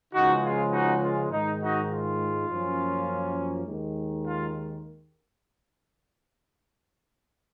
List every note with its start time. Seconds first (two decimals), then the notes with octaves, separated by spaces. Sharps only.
0.12 C#2 C#3 F3 G#3 D#4 F#4
0.42 F4 G#4
0.72 D#4 F#4
1.02 F4
1.30 G#2 D#3 G#3 D#4
1.60 D#4 F#4
1.90 F4
2.49 F#2 F3 A#3 C#4
3.67 D#2 D#3 G#3
4.26 F4